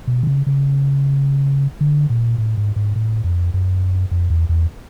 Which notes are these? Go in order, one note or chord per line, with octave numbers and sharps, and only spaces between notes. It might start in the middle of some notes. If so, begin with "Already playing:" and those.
B2
D3
C#3
C#3
D3
A#2
A2
G#2
G#2
A2
F2
F#2
F2
E2
E2